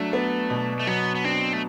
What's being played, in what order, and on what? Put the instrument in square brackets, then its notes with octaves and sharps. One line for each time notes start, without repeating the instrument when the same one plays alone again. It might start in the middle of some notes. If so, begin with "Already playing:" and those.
Already playing: [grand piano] F#3 D4 [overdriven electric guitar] A3
[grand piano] B3
B2
[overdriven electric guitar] A3
[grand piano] F#3 [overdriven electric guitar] B3
[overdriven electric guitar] B3
[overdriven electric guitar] C4 [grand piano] D4
[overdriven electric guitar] A3